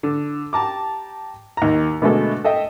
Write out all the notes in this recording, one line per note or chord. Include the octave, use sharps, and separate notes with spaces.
D3
G4 A5 A#5 D6
D#2 A#5
B2 D3 G#3 A3 B3 A4
A4 D#5 E5 G5